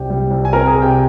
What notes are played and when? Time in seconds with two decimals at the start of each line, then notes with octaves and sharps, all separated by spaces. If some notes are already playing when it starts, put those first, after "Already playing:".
Already playing: C2 C3 G4
0.10 G3
0.31 C2
0.45 G#5
0.53 C4 A#4 A#5
0.67 G#4 G#5
0.74 C3
0.82 G4 G5